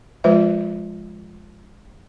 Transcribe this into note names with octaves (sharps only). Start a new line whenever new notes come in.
F3 G#3 F4 B4 C5 E5